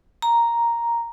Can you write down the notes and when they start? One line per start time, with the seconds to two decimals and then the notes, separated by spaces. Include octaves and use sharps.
0.22 A#5